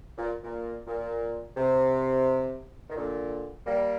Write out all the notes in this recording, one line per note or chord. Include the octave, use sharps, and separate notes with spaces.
A#2
A#2
A#2
C3
D#3
A#2 D3
G3 A#3